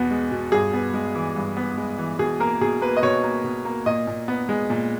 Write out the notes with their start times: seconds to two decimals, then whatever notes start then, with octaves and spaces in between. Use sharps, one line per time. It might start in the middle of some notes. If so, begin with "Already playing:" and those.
Already playing: E2 B2 B3
0.11 G#3
0.31 B2
0.52 G2 G#4
0.73 B3
0.94 G#3
1.15 E3
1.36 G2
1.57 B3
1.78 G#3
1.99 E3
2.19 B2 G#4
2.40 A#3 A#4
2.61 B2 G#4
2.82 A#3 B4
2.97 D#5
3.03 B2 C#5
3.24 A#3
3.44 B2
3.65 A#3
3.86 A#2 D#5
4.07 A#2
4.28 B3
4.49 G#3
4.70 A#2